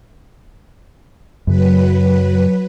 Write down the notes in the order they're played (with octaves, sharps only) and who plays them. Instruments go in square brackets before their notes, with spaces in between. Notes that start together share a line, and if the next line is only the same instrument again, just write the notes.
[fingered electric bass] F#2 C#3 [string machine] F#3 B4